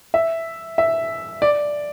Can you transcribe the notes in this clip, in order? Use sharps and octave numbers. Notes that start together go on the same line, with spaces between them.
E5
E5
D5